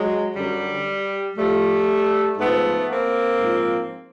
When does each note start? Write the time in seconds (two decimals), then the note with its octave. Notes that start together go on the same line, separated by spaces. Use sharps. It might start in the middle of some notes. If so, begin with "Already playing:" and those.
Already playing: F#3 G#3
0.35 F#2 D3 F#3 G3
1.36 A2 F3 G3 A3
2.37 G#2 F3 A3 B3
2.89 A#3 C4
3.39 G#2 F3